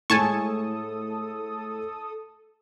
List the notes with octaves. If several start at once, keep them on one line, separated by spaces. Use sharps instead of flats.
A2 G#3 A4 G#5 A5 C#6 D#6